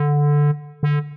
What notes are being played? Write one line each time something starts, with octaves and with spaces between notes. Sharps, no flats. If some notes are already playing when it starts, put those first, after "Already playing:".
Already playing: D3
D3